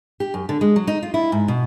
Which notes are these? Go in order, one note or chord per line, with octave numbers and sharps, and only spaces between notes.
G4
F#2
D3
G#3
F#3
D#4
F4
E4
G#2
B2